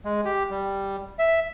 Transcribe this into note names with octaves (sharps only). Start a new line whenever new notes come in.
G#3
G4
G3
E5